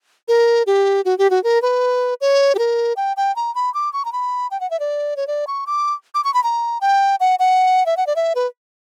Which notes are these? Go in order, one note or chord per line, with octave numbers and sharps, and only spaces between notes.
A#4
G4
F#4
G4
F#4
A#4
B4
C#5
G4
A#4
G5
G5
A#5
B5
D6
C#6
A#5
B5
G5
F#5
E5
D5
C#5
D5
C#6
D6
D6
C#6
B5
A#5
G5
F#5
F#5
E5
F#5
D5
E5
B4